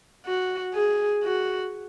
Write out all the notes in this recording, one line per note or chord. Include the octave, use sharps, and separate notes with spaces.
F#4
G#4
F#4